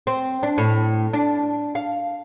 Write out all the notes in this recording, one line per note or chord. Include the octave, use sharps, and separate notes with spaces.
C4
D4
A2
D4
F5